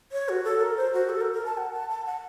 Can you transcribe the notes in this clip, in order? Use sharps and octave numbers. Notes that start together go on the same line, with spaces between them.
C#5
F#4
A4
A#4
C5
F#4
A4
A#4
A#4
A5
F#5
A5
A5
F#5